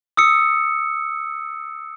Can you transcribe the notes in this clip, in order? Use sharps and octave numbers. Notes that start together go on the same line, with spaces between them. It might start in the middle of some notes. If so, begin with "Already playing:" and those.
D#6 E6 C#7